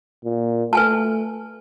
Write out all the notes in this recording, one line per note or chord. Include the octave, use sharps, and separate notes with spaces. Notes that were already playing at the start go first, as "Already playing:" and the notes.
A#2
A3 B4 G#5 A5